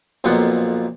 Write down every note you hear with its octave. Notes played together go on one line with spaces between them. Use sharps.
B1 F2 A#2 B3 F4 F#5